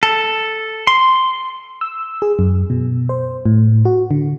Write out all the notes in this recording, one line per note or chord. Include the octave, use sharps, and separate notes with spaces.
A4
C6
E6
G#4
F#2
B2
C5
A2
F#4
D3